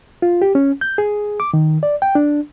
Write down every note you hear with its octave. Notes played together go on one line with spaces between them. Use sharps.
F4
G4
C#4
G6
G#4
D6
D#3
D5
G5
D4